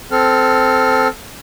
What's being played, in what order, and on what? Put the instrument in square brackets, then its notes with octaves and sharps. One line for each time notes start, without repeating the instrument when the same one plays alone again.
[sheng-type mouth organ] C4 A4 F6